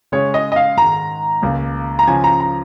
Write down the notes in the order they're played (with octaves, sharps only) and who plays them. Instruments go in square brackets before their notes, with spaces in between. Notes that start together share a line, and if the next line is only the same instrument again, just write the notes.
[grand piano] C#3 G#3 C#4 G#4 [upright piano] C#5
[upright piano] D#5
D#5
F5
[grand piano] G#2 D#3 G#3 [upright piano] A#5
[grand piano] C#2 C#3 A#3
[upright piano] A#5
[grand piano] C#3 F3 C#4 [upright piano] G#5
[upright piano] A#5
A#5